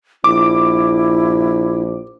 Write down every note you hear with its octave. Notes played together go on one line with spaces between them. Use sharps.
A#1 E4 D6